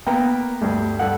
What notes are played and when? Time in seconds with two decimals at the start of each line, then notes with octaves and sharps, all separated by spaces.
0.07 A#3 B3 G5 A#5
0.61 D2 G2
0.99 G2 A4 F#5